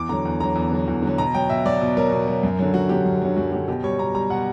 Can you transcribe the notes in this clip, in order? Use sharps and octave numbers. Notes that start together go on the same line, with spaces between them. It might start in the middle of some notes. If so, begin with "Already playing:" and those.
Already playing: E2 D6
D3 F#3 A#5
E2
D3 F#3 A#5
E2
D3 F#3
E2
D3 F#3
B2 A#5
F#3 G5
B2 E5
F#3 D5
B2
F#3 A#4
B2
F#3
F#2
D3 F#3
F#2 F#4
D3 F#3 G4
F#2
D3 F#3
F#2 F#4
D3 F#3 G4
B2 G4
G3 C#5
B2 A#5
G3 A#5
B2 F#5